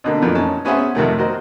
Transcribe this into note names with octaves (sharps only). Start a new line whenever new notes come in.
B2 D3 A#3
F2 A#2 E3 A#3 B3
C#4 D#4 A5
B3 C#4 G#4 C5 E5 F#5
F2 C3 D#3 A3
F#4 A#4 C5 D#5